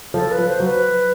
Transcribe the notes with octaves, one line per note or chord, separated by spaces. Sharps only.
F3 A4
B4
F3
C5
F#3
B4